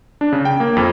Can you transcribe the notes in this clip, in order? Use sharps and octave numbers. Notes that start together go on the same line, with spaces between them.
D4
C#3
G5
A#3
F2